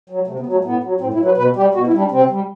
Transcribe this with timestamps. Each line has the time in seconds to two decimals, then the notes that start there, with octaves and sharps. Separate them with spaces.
0.10 F#3
0.27 C3 A3
0.40 B3
0.46 F#3
0.53 A3
0.65 A2 B3
0.83 F#3
1.01 A2 C4
1.14 E4
1.20 F#3
1.25 B4
1.37 B2 B4
1.56 G3 G4
1.74 B2 F#4
1.87 E4
1.93 G3 D4
2.11 C3 C4
2.30 G3